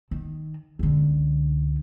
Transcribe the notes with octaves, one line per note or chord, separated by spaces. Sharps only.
D#3
C#2 D3